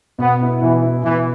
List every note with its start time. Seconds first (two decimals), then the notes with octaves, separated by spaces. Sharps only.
0.19 B2 B3
0.41 B3 E4
0.61 B2 E3
0.83 B3 E4
1.03 B2 E3